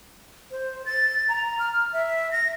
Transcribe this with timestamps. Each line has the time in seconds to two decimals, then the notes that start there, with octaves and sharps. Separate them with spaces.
0.51 C5
0.86 A6
1.29 A#5
1.59 F6
1.93 E5
2.31 A#6